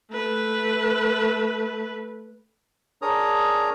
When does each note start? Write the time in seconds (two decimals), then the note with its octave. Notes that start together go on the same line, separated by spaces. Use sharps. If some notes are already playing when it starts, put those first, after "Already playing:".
0.12 A3 B4
3.02 D4 G#4 A#4 C#5 A#5 D#6